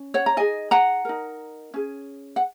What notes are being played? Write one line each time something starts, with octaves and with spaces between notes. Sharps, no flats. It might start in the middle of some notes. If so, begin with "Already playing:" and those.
Already playing: C#4
C#5 F#5
A#5
D#4 G#4 D#5 G#5
F#5 A#5
D#4 A#4
C#4 G#4
F#5